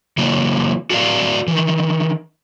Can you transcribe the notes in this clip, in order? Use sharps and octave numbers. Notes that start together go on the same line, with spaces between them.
C#3 E3 F#3 A#3
F#4 A4 A#4 D5 F5
D#3 E3